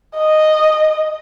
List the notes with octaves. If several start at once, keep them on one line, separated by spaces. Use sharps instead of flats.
D#5